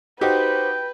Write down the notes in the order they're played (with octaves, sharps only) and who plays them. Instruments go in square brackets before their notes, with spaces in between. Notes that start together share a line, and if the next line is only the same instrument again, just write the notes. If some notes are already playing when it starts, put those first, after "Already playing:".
[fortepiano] D#4 F#4 G4 [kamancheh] B4 [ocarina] C5 [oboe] G5